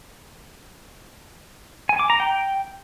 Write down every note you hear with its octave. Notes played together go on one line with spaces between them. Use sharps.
G#5
D6
A#5
G5